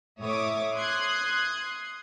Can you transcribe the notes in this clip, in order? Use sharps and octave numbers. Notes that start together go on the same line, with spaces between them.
A2 C#5 E5 D6 D#6
C6 D#6 F#6 G#6